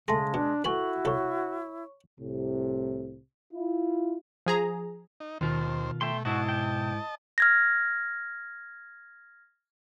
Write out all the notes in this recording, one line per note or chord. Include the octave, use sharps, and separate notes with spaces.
C#3 G#3 A3 G#4 A5 C6 A#6
B2 D4
E4 F#4 A4 B4 G#5 C#6 F#7
C2 A4 C#5 C#6
C2 A2 C3
E4 F4
F3 G#4 A#5
D#4
D#2 B2 D#3 F4 C5
A3 E5 G5 C6
G#2 E4 F#4 D#5 A5
G5
F6 G#6 A#6